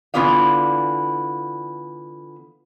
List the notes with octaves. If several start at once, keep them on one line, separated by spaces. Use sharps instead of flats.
D3 E3 B3 F4 D5 F5